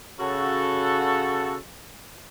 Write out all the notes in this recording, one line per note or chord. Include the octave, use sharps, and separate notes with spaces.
C#3 F#4 A4